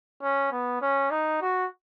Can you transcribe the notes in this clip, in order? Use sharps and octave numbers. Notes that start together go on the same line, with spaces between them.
C#4
B3
C#4
D#4
F#4